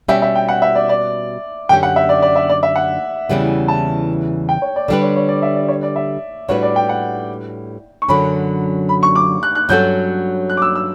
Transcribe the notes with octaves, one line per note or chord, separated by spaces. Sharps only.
B2 G3 C#4 G4 E5
E5
G5
F#5
E5
D5
D5
F#2 D3 A3 C#4 G4 G5
F#5
E5
D5
D5
E5
D5
E5
F#5
E2 C#3 E3 G3 B3
A5
G5
C#5
D5
D3 G3 D4 G4 B4 D5
C#5
C#5
D5
E5
D5
C#5
D5
E5
A2 G3 D4 F#4 B4 C#5
D5
G5
F#5
C#6
F#2 D3 F#3 C#4 B5
B5
C#6
D6
F#6
F#6
G2 F#3 C#4 F#4 A4 G6
F#6
D6
E6
E6